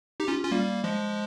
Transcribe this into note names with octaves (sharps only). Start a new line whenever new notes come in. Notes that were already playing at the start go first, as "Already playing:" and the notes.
D#4 G4
C#4 F4
C#4 F4
G3 A#3
F3 G#3